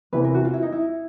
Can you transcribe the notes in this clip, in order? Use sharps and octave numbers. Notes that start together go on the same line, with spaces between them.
E2 C3 E3 B4
A#4
F#4
F4
E4
D#4
E4